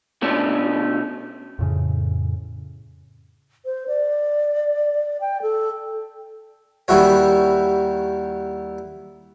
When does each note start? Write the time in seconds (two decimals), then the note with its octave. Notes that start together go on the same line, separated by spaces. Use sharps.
0.22 B2 A3 C#4 D4
1.59 F2 A2 C#3
3.65 C5
3.88 D5
5.21 G5
5.42 A4
6.88 D#2 G3 E4 F#4 C#5